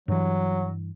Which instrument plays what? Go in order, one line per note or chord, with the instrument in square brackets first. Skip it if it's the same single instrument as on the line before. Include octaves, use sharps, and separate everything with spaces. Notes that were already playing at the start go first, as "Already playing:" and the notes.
[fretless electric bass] G2 E3 [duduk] F#3